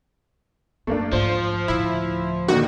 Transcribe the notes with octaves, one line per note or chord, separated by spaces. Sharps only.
F#2 A3 A#3 D4
G#2 F3 C5
D2 A2 E4
A#2 D3 D#3 F#4